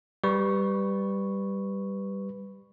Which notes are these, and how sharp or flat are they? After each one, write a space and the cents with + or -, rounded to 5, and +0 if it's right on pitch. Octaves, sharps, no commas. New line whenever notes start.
G3 +0 B4 +5 C#6 +0